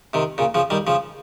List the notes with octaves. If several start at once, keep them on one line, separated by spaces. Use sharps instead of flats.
C3 D#3
A#2 C#3
C#3 F3
D#3 G3
C#3 F3